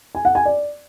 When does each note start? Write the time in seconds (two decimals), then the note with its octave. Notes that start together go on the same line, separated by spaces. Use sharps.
0.15 G#5
0.25 F#5
0.35 G#5
0.45 D5